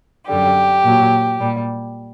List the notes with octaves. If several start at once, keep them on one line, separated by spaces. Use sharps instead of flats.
F#2 D3 G3 G4
A#2 F#3
A#2 G3